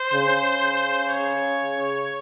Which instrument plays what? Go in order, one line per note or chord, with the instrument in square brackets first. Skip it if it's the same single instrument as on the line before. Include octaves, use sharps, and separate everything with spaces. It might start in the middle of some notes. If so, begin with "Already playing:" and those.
Already playing: [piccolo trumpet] C5
[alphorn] C#3
[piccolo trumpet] C#5